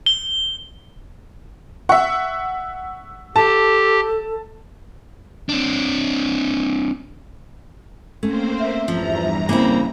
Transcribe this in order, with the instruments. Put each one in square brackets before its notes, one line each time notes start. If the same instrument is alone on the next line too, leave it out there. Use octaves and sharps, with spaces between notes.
[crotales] G7
[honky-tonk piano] E5 F#5 [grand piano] C#6
[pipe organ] G4 [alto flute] A4 [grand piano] A5
[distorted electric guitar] C4 D4
[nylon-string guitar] A3 C#4 [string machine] A#3 C4 C5
[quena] E5
[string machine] E2 G2 A#5 [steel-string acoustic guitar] F3
[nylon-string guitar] C#3 E4 [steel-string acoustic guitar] A#3 C4